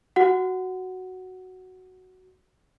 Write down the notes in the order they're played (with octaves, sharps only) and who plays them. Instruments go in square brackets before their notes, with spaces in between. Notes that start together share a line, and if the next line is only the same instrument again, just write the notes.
[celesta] F#4 F#5